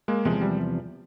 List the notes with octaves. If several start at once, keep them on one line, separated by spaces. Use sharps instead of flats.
G#3 A#3
E2 C3 F3 G#3
G3